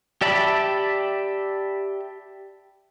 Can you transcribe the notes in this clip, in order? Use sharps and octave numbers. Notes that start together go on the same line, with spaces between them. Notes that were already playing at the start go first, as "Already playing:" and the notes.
G4 D5 E5 A5 B5